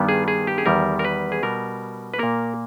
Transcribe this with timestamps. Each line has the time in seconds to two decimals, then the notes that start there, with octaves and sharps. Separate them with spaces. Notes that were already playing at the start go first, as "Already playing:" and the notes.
Already playing: G2 D#3 G3 B3
0.09 G#4
0.28 G#4
0.47 G4
0.58 G#4
0.66 E2 D#3 G3 A#4
0.99 A#4
1.04 B4
1.32 G#4
1.43 B2 G3 B3 A#4
2.14 B4
2.18 A#2 A#3 A#4